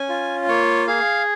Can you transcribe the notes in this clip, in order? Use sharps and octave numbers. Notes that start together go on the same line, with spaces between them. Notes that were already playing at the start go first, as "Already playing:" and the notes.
Already playing: C#4 G#5
F4
A#3 C#5
G#4 F5